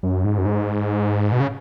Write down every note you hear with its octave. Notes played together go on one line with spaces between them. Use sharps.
F#2
G#2
F#2
G#2
B2
C#3